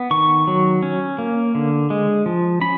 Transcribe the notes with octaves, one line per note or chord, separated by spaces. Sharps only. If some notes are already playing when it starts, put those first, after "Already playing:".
Already playing: B3
D#3 C#6
F#3
C#4
A#3
D3
G#3
F3
C#4 B5